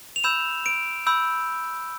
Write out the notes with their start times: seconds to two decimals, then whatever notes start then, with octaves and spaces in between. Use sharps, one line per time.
0.16 F7
0.24 B5 E6 G6 E7
0.66 D7
1.06 B5 E6 G6